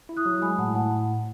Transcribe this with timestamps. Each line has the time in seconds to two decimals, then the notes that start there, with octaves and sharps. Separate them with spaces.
0.09 E4
0.17 D#6 F#6
0.26 F#3
0.42 G#3 G#5 B5
0.58 A2 F#5 A5
0.75 A2 F#5 A5